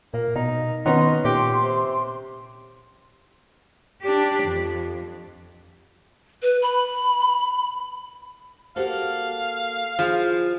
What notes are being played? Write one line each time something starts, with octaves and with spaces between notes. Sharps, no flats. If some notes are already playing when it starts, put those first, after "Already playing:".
A#2 A#3
B2 D#4
D#3 B3 C#4 D#4 C6
A#2 G4
C3
D4 G4
F2
B4
B5
A#3 F#4 G4 A4 C5 F5
F3 E4 F4 G#4